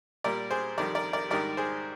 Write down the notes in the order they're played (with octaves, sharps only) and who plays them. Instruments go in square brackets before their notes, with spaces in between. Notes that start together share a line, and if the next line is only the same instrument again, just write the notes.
[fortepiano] A#2 G3 A#4 D5
G#4 C5
F2 D#3 G3 A#4 D5
A#4 D5
A#4 D5
G#2 D#3 G3 A#4 D5
G#4 C5